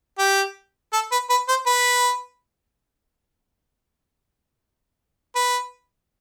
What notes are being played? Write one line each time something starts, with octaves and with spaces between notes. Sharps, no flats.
G4
A4
B4
B4
C5
B4
B4